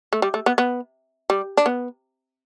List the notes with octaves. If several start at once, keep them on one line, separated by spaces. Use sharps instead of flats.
A3
G3
A3
B3
B3
G3
D4
B3